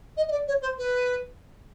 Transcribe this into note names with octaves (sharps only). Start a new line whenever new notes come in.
D#5
D#5
D5
C#5
C5
B4